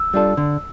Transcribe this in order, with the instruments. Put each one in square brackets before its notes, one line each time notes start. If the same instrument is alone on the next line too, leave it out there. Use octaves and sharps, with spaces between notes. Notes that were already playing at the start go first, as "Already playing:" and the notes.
Already playing: [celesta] E6
[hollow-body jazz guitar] G3 D4 F4 A4
D3